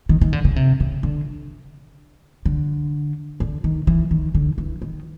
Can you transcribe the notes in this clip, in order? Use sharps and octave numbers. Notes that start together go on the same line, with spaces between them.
D#3
D#3
D3
C#3
C3
C#3
D3
D3
D3
D#3
E3
D#3
D3
E3
D#3